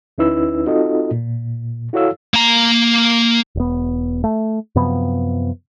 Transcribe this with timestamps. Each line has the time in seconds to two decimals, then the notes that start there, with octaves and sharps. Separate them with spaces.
0.18 D2 C#4 D#4 E4 B4 E6
0.66 C4 D#4 F4 F#4 A4 D#5
1.11 A#2
1.93 E4 F#4 A4 C#5 F5 E6
2.34 A#3 A#5
3.55 E1 B3
4.24 A3
4.75 F#2 C3 F3 B3